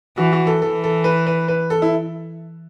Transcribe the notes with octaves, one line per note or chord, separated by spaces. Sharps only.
E3 F#4
F#4
A4
E3 A4
A4
B4
B4
B4
A4
E4